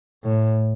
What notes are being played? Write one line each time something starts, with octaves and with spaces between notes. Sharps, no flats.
A2